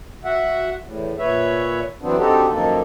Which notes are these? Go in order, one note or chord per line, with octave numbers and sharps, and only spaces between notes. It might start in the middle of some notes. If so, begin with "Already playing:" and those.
F#4 E5 F#5
E2 A2
A#2 B4 C#5 E5
E3 F#3 B3 C4 D4
D3 C4 D#4 F#4 G4 A4
F#2 D#3 F3 A#3 A4